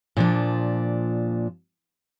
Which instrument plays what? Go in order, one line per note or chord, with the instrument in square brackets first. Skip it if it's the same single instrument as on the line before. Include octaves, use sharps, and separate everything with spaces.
[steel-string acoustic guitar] A#2 F3 D4